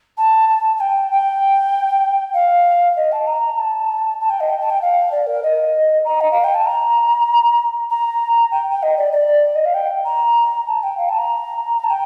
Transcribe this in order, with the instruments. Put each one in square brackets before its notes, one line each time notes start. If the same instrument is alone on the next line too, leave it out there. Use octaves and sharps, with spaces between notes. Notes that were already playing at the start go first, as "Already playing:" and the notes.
[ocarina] A5
A5
A5
G5
G5
F5
D#5
A5
A#5
A5
A5
G5
D#5
G5
A5
G5
F5
D5
A#4
D#5
A#5
D#5
F5
G5
A5
A#5
A#5
G5
G5
D#5
D5
D5
D#5
F5
G5
A#5
A5
G5
F5
A5
A#5
A#5
A5
G5